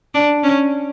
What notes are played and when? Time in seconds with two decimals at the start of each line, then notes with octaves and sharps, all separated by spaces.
0.14 D4
0.43 C#4